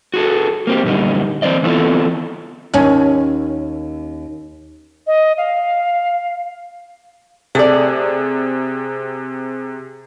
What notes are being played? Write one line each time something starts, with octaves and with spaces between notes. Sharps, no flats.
F#4 G#4 A4
A#3 C4 G4
F#2 A#2 D3 G3 D#4
E3 C4 C5 D5 D#5
E3 B3 C4 E4 F4 A4
D#2 C#4
D#5
F5
C3 A3 G#4 D5